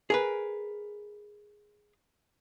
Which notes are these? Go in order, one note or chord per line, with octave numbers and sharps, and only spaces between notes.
G#4 A#4 B4